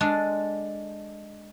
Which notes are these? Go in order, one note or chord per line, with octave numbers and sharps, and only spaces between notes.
G#3 D4 A4